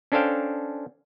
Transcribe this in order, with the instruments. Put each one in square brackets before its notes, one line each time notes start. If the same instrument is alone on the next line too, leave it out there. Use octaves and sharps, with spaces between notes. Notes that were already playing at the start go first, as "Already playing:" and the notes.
[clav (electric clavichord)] C#4 D4 A4 C5 F5 G5